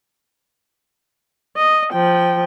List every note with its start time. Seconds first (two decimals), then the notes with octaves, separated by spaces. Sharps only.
1.57 D#5
1.93 F3 G5